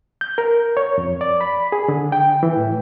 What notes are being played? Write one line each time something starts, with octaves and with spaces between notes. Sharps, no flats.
G6
A#4
C#5
F2
D5
B5
G#4
D3
G5
E3
A2